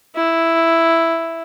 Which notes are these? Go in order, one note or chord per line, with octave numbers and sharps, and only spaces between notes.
E4